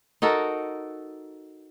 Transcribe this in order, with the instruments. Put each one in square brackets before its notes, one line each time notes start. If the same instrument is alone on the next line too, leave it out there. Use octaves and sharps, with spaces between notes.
[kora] D#4 F#4 A4 A#4